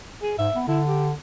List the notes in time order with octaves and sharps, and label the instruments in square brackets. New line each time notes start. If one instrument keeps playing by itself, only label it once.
[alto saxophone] G#4
[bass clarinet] G#2 [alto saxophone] E5
[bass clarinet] B3
[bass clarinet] D3 [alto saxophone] E4
[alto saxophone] G4